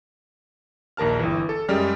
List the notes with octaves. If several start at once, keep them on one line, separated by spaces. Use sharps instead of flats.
A#1 D#2 A#4 A5 F6
G1 E3
A4
F#2 G3 G#3 D5 F6